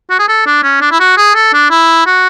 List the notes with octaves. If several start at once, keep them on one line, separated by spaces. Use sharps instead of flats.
F#4
G#4
A4
D4
C#4
D4
E4
F#4
G#4
A4
D4
E4
F#4